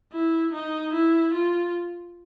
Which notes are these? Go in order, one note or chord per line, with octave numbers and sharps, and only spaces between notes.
E4
D#4
E4
F4